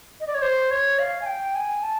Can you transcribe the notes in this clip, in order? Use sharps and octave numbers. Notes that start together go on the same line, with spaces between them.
D#5
D5
C#5
C5
C#5
F5
G#5
G5
G#5
A5